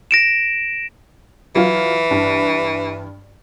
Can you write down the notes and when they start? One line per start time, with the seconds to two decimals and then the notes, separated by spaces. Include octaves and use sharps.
0.11 A#6 D7 E7
1.56 E3 F#3 F4
2.11 G2